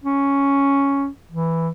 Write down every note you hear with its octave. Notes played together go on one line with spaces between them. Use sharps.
C#4
E3